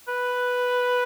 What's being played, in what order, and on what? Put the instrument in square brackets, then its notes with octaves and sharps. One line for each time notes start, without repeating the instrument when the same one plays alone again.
[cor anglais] B4